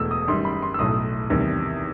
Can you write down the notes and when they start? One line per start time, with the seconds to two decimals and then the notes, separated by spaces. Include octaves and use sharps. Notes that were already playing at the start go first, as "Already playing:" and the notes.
Already playing: E1 E2 B2 A3 E6
0.11 D#6
0.28 F#2 D#3 G3 C6
0.45 B5
0.62 C6
0.74 E6
0.79 B1 A2 F#3 A3 D#6
1.30 E2 C3 D#3 G3